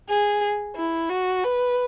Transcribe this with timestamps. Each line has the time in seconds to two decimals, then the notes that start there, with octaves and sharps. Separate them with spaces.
0.09 G#4
0.76 E4
1.10 F#4
1.44 B4